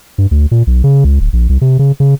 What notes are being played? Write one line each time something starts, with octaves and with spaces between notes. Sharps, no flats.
G2
D2
A#2
B1
C#3
C#2
D1
A#1
C2
C3
C#3
C#3